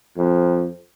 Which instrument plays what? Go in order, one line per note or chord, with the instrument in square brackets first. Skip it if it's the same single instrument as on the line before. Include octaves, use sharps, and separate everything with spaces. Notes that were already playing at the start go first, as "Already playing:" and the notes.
[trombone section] F2